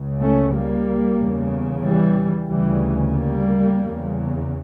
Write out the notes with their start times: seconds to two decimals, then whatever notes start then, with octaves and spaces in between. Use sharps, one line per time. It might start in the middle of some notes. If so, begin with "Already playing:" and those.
Already playing: C#2 C#3
0.21 A3 C#4
0.54 G3 A#3
1.18 E2 C#3
1.83 E3 G3
2.48 D2 C#3 E3 G3
3.13 G3 A#3
3.77 E2 C#3